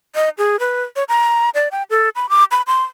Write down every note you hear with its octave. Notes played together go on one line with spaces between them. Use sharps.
D#5
G#4
B4
C#5
A#5
D5
G5
A4
B5
D6
B5
C6